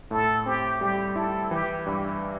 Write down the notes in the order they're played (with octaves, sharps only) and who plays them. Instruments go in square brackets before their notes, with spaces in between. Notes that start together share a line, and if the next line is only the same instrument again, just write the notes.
[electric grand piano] A2 [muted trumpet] A4
[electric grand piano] C4 [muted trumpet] G4
[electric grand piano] G3 [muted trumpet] G4
[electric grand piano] E4 [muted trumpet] A4
[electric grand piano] E3 [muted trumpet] G4
[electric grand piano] G2 [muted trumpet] G4